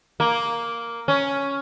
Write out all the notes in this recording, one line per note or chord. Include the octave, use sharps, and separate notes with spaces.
A#3
C#4